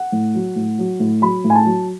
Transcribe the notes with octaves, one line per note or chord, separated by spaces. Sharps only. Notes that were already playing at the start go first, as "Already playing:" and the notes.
Already playing: F#5
A2
F#3
A2
F#3
A2
F#3 B5
A2
G#5
A5
F#3